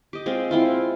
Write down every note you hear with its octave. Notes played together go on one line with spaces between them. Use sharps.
G4 D#5
G#3 C4 F4
C4 E4 F4